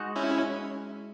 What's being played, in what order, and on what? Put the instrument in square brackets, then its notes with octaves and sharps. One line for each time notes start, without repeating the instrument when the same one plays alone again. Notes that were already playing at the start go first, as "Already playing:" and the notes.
Already playing: [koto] G#3 D#4 F#4
[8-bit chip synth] C#4 E4